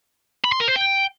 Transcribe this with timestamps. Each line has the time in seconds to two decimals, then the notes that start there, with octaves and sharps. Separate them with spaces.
0.44 B5
0.52 C6
0.60 A#4
0.68 C5
0.76 G5